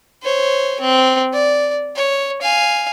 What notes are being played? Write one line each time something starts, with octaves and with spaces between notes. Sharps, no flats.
C5 C#5
C4
D5
C#5
F5 G#5